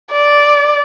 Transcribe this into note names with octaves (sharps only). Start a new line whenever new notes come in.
D5